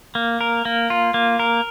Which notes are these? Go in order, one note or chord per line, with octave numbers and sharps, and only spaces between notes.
A#3
A#4
A#3
F4
A#3
A#4